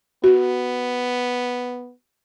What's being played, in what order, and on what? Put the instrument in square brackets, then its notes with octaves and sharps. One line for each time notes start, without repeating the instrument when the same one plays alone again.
[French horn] B3 [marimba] F#4